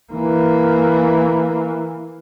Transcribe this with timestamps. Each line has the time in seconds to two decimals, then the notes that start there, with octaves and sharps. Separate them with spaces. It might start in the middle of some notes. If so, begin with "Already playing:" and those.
0.13 E3 A#3